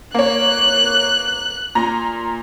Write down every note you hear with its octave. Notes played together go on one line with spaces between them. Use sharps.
A#3 C#5 F#6
A#2 A#5